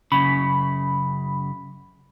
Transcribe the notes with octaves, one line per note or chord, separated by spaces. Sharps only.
F#2 C#3 B5